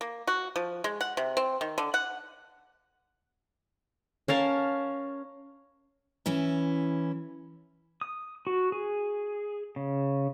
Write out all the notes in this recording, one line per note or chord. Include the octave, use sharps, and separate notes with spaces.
A#3
F#4
F3
G#3
F#5
C3
C4
D#3
D3
F#5
C#4 A#4 F5 A5
E3 C#4 E4
D#6
F#4
G#4
C#3